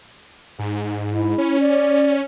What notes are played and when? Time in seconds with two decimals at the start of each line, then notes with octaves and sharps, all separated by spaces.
0.59 G#2
1.12 E4
1.38 C#4
1.60 D5